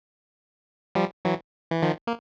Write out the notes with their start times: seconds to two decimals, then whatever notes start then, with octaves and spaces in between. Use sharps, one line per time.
0.95 F3 G3
1.25 E3 F#3
1.71 E3
1.82 D#3 F3
2.07 A#3